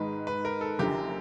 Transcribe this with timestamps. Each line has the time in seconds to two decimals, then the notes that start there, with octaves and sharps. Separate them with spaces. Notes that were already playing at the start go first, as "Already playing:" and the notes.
Already playing: G#2 D#3 G#3 B4
0.27 B4
0.45 A#4
0.61 A4
0.79 F#1 F#2 D3 F3 G4